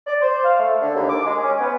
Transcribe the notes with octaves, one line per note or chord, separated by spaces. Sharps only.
D5
C5
F5
A3
D3
D#2
D6
G#3
C#4
B3